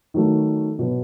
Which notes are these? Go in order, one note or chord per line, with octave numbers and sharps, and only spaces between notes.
D#3 F#3 A3
B2 F#3 B3